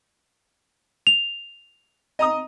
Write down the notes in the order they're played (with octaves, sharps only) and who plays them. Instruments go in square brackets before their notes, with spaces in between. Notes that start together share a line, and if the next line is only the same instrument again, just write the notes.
[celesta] F7
[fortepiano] D#5 A#5 D#6